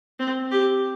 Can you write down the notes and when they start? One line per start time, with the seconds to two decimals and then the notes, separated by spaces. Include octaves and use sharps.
0.20 C4
0.52 G4